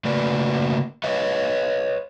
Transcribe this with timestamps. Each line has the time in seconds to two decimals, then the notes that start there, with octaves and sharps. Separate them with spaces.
0.05 C#3 A3 A#3 F#4 B4 D5
1.04 B4 C#5 D#5